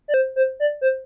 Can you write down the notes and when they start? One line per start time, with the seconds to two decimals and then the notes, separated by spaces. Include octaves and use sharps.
0.08 D5
0.14 C5
0.36 C5
0.60 D5
0.81 C5